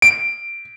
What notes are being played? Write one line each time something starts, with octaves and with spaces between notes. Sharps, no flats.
D7